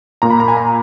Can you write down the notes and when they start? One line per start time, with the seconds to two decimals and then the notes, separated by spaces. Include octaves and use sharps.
0.22 A#2 A#3 A#5
0.30 B5
0.40 A#5
0.48 G#5
0.57 A#5